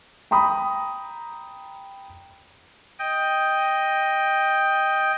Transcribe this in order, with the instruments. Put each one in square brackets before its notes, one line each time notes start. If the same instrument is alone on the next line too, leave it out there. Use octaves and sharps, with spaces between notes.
[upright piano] G5 A#5 B5 D#6
[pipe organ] D#5 G5